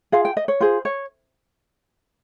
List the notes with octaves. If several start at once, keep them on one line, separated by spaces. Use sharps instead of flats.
F4 G#4 F5
G5
D#5
C#5
F4 G#4 C5
C#5